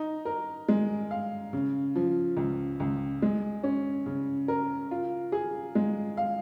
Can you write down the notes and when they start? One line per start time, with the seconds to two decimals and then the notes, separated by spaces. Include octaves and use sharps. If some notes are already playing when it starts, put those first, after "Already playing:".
Already playing: D#4
0.25 A#4
0.68 G#3
1.11 F5
1.53 C#3
1.96 F3
2.37 C#2
2.80 C#2
3.22 G#3
3.63 C#4
4.06 C#3
4.48 A#4
4.91 F4
5.32 G#4
5.75 G#3
6.17 F5